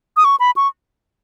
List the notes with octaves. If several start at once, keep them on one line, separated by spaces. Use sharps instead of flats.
D#6
C#6
B5
C#6